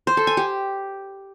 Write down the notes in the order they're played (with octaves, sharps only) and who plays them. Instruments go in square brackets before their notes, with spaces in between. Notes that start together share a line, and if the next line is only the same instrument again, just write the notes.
[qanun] C5
A4
G#5
G4